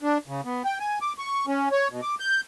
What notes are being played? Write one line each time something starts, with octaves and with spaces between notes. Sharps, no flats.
D4
C#3
B3
G5
G#5
D6
C#6
C#4
C#5
B2
D6
G6